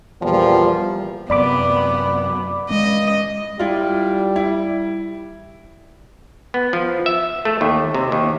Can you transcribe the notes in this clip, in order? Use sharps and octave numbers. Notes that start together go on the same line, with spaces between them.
E2 A#2 F3 G3
F#2 C3 B3 D5 B5 D6
G#3 C#4 D#5
G3 E4 F4
E4
B3
F3
E5
A3
D#2
C3
D#2